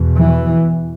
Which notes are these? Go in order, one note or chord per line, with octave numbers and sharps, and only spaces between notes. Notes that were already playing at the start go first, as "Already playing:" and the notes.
Already playing: E2 B2
E3